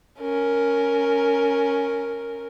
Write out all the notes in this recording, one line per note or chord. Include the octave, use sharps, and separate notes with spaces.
C#4 A#4